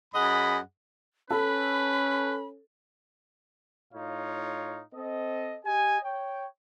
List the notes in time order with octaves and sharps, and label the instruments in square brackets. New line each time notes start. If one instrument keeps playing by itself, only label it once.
[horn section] F#2 G#4 D#5 F#5 B5
[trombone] C#4 [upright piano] A4 [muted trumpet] B4 [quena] B5
[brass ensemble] A2 D#4 F4 C#5 F5
C4 A4 D#5
G4 D#5 G#5
C#5 G5